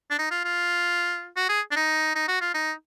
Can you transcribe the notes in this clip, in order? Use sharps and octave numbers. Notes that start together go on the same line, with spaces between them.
D4
D#4
F4
F4
F#4
G#4
D4
D#4
D#4
F#4
F4
D#4